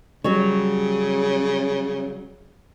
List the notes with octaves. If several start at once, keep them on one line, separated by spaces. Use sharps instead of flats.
C#3 F#3 G3 C#5